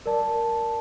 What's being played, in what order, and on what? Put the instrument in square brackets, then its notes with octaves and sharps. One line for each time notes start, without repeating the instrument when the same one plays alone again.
[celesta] A#4 D5 A5